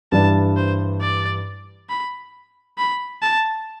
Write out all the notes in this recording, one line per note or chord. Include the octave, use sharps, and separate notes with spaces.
G2 E3 G3 D4 A5
C5
D5
B5
B5
A5